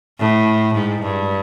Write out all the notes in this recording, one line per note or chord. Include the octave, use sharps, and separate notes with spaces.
A2
G#2
G2